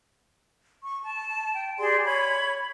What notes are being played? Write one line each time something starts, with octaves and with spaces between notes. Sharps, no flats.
C#6
A5
G5
G4 G#4 D5 C6
C#5 B5 G#6